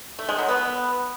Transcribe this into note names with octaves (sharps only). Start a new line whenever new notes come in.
A3
G#3
F#3
B3